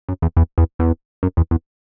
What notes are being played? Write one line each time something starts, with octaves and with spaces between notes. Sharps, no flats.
F#2
E2
E2
E2
E2
F#2
E2
E2